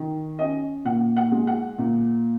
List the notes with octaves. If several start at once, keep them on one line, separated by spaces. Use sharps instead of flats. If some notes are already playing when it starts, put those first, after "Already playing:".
Already playing: D#3
C#4 D#5
A#2 F#5
F#5
G#3
F#5
A#2